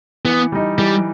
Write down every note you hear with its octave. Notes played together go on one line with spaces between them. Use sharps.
E3 B3
G3 D#4
E3 G3